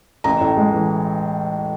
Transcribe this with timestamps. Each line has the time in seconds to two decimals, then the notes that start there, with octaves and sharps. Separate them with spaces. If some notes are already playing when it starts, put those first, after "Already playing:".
0.24 A1 A#5
0.41 A2
0.57 G#3
0.72 E3